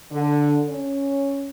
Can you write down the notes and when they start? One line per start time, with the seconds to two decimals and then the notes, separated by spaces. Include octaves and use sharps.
0.12 D3
0.67 C#4